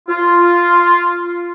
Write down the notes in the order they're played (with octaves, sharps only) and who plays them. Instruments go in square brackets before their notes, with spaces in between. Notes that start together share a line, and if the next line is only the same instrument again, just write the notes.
[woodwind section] F4